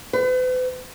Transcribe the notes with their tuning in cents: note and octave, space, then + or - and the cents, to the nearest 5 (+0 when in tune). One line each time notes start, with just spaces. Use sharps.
B4 +45